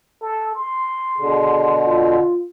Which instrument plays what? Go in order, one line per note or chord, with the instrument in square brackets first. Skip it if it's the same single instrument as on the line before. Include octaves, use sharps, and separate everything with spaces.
[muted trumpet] A4
C6
[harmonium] B2 D3 [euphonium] G#4
[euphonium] F4